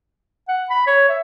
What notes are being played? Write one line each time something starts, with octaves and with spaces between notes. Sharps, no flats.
F#5
B5
C#5
E5